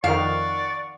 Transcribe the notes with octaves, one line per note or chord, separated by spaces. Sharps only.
F2 D#3 D5 F5 F#5 C#6